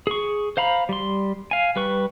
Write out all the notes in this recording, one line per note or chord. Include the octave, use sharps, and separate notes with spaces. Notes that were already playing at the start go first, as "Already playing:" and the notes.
G#4 C#6
C5 F5 A#5 B5
G3 C6
F5 G#5
G3 B4 C#6